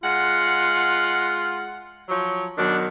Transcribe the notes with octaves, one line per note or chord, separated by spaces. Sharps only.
G#3 F4 F#5
F3 F#3 C#5
B2 D#3 F#3 D4